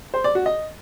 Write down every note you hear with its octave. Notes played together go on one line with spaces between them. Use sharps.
C5
D5
F#4
D#5